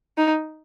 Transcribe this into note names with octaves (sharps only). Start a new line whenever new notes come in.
D#4